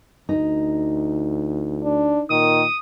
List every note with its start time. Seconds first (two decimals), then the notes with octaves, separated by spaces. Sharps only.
0.29 D2 D#4
1.83 D4
2.30 A#2 D#3 D#6